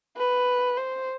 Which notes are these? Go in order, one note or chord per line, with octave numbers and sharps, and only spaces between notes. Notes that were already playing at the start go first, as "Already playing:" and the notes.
B4
C5